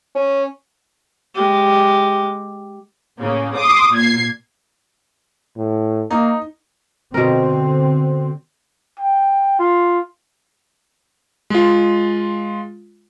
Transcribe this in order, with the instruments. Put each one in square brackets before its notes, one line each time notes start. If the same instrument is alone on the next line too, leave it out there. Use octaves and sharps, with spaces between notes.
[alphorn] C#4
[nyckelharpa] G#3 G4
[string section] A2 C#3 A#3
C6 D6 D#6
A#2 G#6 C7
[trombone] A2
[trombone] A#3 [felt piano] D#4
[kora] B2 A#4 [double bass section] D3 C4
[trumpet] G5
F4
[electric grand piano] G#3 F4